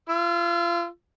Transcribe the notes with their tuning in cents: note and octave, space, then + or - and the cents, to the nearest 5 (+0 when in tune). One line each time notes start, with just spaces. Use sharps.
F4 -30 E6 +15